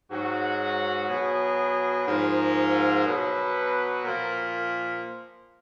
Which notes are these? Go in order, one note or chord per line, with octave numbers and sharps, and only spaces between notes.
G#2 F#3 F#4
B2 F#3 G#4
G#2 F3 A#4
B2 F#3 B4
A#2 F3 A#4